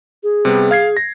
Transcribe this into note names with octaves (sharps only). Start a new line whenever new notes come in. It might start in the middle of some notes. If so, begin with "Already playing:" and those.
G#4
C3 G3 B3
F5 G#6 C7
A#6